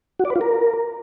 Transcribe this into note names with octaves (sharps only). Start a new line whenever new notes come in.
F#4
D5
B4
F4
A#4